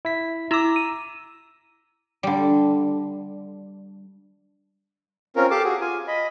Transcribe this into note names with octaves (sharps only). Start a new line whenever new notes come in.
E4 B6
E4 A#5 D6 E6
D#7
D3 G3
C4 C#4 F4 A#4
G4 A4 F5 A5 D6
F#4 G#4
F4 G#5
D#5 B5